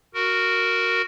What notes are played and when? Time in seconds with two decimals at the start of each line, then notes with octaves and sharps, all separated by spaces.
0.14 F#4 A#4